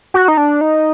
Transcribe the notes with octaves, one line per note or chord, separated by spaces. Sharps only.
F#4
D#4
D4
D#4